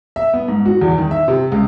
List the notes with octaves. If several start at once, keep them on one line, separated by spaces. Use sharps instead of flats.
E5
B3
G#2
F#4
E2
D#3
E5
C3
C#2